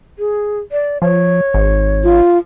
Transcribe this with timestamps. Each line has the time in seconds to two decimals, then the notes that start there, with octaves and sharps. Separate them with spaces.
0.19 G#4
0.72 D5
1.02 F3 C#5
1.54 G#1
2.04 F4